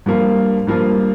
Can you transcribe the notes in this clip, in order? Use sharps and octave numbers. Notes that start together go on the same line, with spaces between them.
G2 F3 A#3 F4
G2 F3 A#3 F4